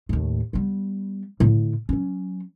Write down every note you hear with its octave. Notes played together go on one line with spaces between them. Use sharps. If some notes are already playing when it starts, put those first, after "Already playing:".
D#2 A2
G3 B3
A2 D3
F#3 C#4